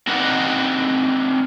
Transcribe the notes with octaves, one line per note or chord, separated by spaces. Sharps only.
C4 D4 D#4 F#4 B4 F#5